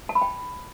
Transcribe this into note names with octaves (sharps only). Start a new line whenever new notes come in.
A5
B5
G5